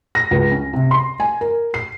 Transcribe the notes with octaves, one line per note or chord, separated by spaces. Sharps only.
A#6
C#2
C#4
C3
C6
G#5
A#4
C7